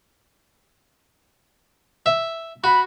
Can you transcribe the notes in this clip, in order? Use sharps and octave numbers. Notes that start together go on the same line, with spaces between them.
E5
F#4 B5